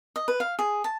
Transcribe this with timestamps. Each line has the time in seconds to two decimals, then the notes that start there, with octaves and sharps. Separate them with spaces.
0.16 D#5
0.28 B4
0.40 F5
0.59 G#4
0.84 A5